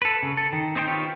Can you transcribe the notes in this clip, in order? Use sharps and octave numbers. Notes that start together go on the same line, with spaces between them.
A4 B4
C#3
A4
D#3
C4 D#4 C5 C#5 G5
D#4 F4 G4 B4 C#5